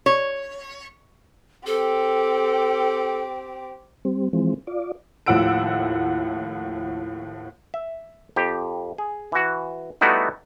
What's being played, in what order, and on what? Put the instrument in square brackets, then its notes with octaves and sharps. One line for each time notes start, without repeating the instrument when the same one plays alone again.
[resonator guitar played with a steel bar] C#5
[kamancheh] C4 G4 [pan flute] A4
[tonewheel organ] G3 C4
E3 F3 G#3 C4
F4 D5
[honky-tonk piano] D#2 A2 F3 F#5 E6 D7
[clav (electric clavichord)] E5
F2 G4
G#4
E3 F#4
G3 A3 B3 D#4 E4 F#4